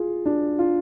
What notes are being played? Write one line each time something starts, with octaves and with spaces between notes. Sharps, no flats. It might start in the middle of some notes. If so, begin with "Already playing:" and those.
Already playing: F4 G#4
D4
F4